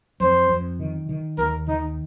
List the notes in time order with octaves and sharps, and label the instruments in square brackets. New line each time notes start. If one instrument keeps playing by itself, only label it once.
[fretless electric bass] F2 [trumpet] C5
[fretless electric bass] F2
D#3
D#3
[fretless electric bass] D#2 [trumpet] A#4
[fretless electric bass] D#3 [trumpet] D#4